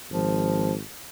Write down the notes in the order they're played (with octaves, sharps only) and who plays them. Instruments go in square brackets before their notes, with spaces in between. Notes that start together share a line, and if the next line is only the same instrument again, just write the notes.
[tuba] G#1 [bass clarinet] F3